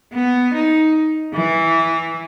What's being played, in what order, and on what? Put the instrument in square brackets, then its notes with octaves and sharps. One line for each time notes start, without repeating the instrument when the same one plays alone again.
[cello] B3
D#4
E3